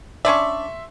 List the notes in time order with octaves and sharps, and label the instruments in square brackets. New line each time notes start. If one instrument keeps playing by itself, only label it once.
[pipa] C#4 D4 D5 [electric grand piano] E5 C6 C#6